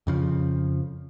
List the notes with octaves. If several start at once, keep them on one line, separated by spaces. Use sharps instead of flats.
F2 C#3 F3